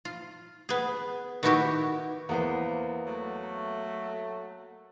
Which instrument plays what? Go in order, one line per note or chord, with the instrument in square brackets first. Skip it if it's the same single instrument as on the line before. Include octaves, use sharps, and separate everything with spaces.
[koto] F4
B3 G#4
D#3 B3 E4 F#4 G4
[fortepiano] E2 [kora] A#3 B3 C5
[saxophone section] F#3 A3